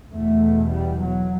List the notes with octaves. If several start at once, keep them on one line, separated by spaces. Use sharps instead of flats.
E2 B2 A3
G3
F#3